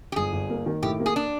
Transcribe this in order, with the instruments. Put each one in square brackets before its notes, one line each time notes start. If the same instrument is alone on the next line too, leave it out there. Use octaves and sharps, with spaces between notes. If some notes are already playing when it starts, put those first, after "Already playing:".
[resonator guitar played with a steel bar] G4
[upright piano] G1 [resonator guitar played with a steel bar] G#4
[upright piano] G1
A#3
D#3
[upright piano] A2 [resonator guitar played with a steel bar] G4
[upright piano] A#3
[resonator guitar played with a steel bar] G#4
D4